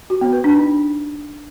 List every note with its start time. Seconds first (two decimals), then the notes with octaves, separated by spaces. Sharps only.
0.10 F#4
0.21 B3
0.33 B4
0.44 D4
0.56 D#4